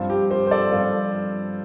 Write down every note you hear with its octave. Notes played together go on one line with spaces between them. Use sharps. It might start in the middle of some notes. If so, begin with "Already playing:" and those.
Already playing: G2 F3 C4 F4
G4
G4 C5
C5
A4 D5
G2 F3 C4 F4 A4